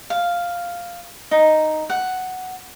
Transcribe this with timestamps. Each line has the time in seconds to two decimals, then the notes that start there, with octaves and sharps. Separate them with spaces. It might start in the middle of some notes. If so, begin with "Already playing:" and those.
0.10 F5
1.31 D#4
1.90 F#5